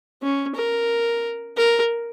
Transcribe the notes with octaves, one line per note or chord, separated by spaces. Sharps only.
C#4
A#4
A#4